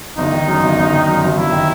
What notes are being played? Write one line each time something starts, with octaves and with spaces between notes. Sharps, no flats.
G1 D#4
D#3
F#2
G1
G1
D#3
F#2
G1
G1 E4
D#3